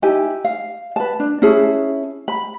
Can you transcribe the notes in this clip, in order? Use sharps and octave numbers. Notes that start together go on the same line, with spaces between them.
D#4 E4 G4 G#5
F5
B4 A5
D4
C#4 E4 G#4 A5
B5